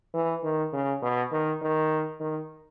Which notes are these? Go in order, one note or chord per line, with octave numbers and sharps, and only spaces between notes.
E3
D#3
C#3
B2
D#3
D#3
D#3